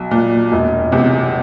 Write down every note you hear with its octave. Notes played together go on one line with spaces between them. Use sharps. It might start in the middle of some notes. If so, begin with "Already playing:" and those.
Already playing: B1
A#2
E1
E2 C3